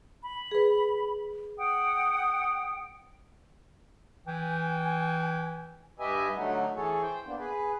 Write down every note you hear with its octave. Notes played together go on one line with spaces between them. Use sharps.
B5
G#4 B4
F#5 G5 D#6
E3 G5 G#5
G2 G4 B4 D#5 E5 G#5
D3 F#3 A3 D#4 F#4
E3 G#4 A4 C#5
C5 G5
A#3 B3 D4
G#4 B4